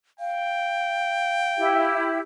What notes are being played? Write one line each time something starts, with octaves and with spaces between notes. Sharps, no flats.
F5 G5
E4 G4